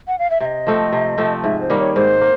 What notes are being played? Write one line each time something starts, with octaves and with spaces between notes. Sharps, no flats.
F#5
F5
E5
C3 D#5 E5
F3 A3 C4
C3
F3 A3 C4
G#2 E5
C5
D#3 G3 A#3
C#5
G#2 C5
A#3